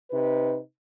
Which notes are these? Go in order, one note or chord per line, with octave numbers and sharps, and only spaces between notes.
C3 D#4 B4